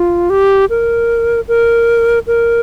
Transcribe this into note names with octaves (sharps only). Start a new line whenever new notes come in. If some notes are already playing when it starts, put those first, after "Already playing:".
Already playing: F4
G4
A#4
A#4
A#4